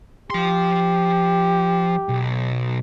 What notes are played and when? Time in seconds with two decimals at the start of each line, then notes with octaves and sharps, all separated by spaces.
0.30 F3 G4 C6
2.09 B1